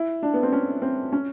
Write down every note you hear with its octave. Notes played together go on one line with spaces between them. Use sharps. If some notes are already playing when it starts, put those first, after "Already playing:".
Already playing: E4
D4
B3
C4
C#4
C4
C#4